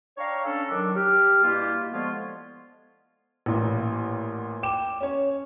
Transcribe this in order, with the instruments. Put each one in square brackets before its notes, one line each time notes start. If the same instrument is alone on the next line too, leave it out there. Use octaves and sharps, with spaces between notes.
[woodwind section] D4 C#5 F5 G5 A#5 C#6
C#4 D4 A4
D#3 F#3 D4
G4 F6
G2 B2 A#3 E4 F4 G4
D3 F3 G#3 B3 F4 C#5
[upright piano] A1 A#2
G5 D6 E7
C#4 C#5